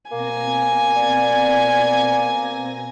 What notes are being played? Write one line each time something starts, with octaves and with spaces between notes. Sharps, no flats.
B2 A#3 C4 G#5 A#6
D5